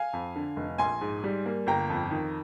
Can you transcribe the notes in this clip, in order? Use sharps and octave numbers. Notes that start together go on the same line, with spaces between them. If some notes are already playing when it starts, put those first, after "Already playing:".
Already playing: F5 G#5
F2
D3
F1
A#1 G#5 C6
G#2
G3
A#3
G1 G5 A#5
F2
D#3